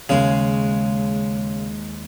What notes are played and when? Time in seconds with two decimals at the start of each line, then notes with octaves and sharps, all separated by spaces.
0.09 D#2 C#3 G#3